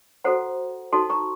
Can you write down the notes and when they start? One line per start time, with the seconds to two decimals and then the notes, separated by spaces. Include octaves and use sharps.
0.24 F#4 A4 C5 F#5 A#5
0.93 D#4 F#4 A4 A5 C6
1.10 A#5 C#6